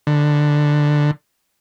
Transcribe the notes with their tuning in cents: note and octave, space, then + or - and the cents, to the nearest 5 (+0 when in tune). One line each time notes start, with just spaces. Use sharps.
D3 +10